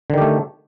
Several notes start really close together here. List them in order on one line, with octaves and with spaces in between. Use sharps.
D3 D#3 G4 A3